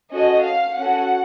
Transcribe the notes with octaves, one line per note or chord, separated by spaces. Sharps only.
C#4 F#4 A4 D#5
F5
C#4 F#4 A4 F#5